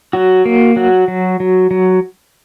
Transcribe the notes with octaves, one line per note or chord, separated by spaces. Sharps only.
F#3 F#4
A#3
F#3 F#4
F#3
F#3
F#3